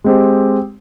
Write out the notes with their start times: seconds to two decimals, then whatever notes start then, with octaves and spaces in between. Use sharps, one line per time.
0.04 G#3 C4 G4